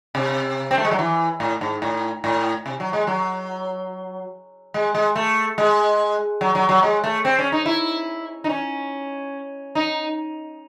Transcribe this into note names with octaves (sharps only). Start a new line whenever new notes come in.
C3
C4
A3
G#3
F#3
E3
A2
G#2
A2
A2
C3
F#3
G#3
F#3
G#3
G#3
A3
G#3
F#3
F#3
F#3
G#3
A3
C4
C#4
D#4
E4
D#4
C#4
D#4